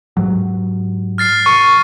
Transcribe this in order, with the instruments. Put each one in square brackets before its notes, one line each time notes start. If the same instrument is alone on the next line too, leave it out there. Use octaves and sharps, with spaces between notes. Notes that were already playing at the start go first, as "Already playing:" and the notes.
[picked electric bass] G#2 F#3
[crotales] F6 A6 C7
[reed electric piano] C#6 [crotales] D#7